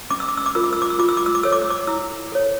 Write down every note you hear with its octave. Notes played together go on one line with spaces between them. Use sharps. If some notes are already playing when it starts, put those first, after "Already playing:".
C#4 D6
E6
D6
E6
D6
F4 A#4 E6
D6
E6
D6
E6
F4 D6
E6
D6
E6
D6
A4 C#5 E6
D6
E6
D6
E4 E6
A4 C#5